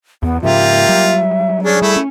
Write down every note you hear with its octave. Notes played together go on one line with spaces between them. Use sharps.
E2 B3
G#2 C#3 F3 A#3 F4 G4 E5
F#3 G3
C#4 D4 G#4
G3 A3 E4
C#4